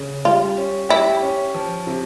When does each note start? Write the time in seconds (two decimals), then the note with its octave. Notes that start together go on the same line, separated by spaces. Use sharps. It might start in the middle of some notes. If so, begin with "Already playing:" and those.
Already playing: C#3
0.25 G3 F4
0.57 C#4
0.89 E4 G4
1.22 C#4
1.54 F3
1.87 C3